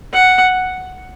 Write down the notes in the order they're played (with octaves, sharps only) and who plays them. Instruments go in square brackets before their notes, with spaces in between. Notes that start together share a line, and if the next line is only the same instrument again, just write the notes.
[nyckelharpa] F#5